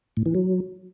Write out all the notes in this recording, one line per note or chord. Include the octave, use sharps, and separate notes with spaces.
A2
E3
F#3